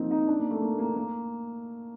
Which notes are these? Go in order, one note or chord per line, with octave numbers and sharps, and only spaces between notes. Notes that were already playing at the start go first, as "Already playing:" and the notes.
Already playing: F3 A#3 C4 D#4
D#4
D4
A#3
A3
A#3
A#3
A#3